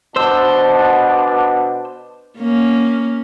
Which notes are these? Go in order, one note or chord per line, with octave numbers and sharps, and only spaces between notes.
B2 D4 C5 E6
A#3 C#4